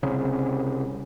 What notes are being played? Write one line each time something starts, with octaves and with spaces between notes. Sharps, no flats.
C2 C#3